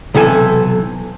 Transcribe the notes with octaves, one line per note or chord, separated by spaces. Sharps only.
B1 C3 E3 A4 G#5